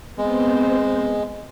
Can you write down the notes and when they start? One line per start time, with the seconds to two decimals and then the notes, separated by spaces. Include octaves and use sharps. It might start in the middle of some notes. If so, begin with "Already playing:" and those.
0.18 G#3 B3 C4 C5